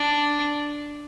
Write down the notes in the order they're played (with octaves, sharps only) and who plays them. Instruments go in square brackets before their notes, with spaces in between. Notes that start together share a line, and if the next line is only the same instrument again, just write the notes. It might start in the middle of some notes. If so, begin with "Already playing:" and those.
Already playing: [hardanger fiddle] D4